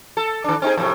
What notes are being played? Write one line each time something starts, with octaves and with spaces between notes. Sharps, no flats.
A4
D#3 D4
C4 D#4 G#4
F2 A2 C3